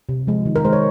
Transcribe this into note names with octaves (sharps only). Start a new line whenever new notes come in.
C3
F3 G#3
D#3
A#4
G#3 C5
C#5